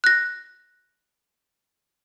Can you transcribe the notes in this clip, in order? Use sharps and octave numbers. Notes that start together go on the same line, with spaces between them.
F#6 A#6